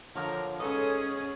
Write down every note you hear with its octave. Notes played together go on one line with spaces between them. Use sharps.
D3 F3 A#4 C#5 F5
G#2 C#4 G#4 A4 B4 C#5 D#6